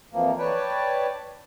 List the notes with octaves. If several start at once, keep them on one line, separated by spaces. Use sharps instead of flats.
F2 E3 F3 A#3
B4 C#5 D5 G5 A5